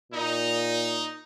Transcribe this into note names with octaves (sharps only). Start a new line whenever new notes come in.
A#2 D#4